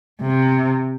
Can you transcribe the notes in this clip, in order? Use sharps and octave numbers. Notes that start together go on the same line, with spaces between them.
C3